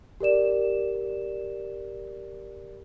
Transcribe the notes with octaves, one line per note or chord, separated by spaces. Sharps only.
G4 A#4 D5 E7